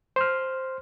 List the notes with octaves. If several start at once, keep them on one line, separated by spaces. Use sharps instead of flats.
C5 C6 F6